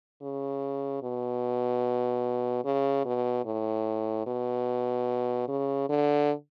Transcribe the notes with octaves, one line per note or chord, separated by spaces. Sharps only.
C#3
B2
C#3
B2
A2
B2
C#3
D3